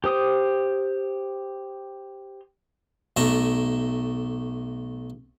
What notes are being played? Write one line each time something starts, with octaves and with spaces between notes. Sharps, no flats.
G4 C5 D#6
B1 A3 A5 A#5